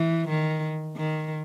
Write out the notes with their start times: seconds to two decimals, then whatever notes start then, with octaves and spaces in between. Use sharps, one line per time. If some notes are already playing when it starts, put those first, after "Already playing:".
Already playing: E3
0.29 D#3
0.97 D#3